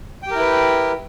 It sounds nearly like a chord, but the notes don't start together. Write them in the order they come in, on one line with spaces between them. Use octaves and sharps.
G5 G4 A#4 E4 B4